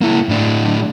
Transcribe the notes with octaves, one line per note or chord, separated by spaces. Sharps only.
A#3 E4
A2 D4